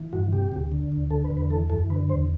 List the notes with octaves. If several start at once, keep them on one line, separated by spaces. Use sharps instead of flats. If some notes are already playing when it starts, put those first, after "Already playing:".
Already playing: E3
G2 F#4
C3 G4
D2
D3
D2
D3 A4
B4
E2
B4
E3 A4
F#2 A4
D3 B4
E2 C5